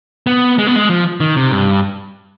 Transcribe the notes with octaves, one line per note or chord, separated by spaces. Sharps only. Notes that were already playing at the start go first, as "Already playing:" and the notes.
B3
G#3
B3
G#3
F3
D#3
C3
G2